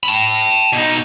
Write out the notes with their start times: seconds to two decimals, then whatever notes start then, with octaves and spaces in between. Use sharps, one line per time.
0.03 A5 B5
0.73 B2 D#4